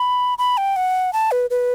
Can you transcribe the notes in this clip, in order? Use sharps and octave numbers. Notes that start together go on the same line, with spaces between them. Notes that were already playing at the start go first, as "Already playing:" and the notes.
Already playing: B5
B5
G5
F#5
A5
B4
B4